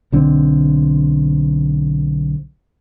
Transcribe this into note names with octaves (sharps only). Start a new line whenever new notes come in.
B1 D3 C4